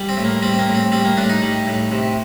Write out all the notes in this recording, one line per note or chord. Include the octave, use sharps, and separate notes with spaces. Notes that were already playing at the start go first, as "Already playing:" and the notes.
Already playing: G3
C4
A2
A#3
G3 C4
C4
A#3
A2
C4
G3 C4
A#3
A2 D4
D#4
G3
A2
C3